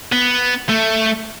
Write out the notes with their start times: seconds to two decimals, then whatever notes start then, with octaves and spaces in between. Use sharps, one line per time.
0.12 B3
0.69 A3